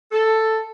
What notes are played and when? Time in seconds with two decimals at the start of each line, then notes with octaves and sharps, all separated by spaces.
0.12 A4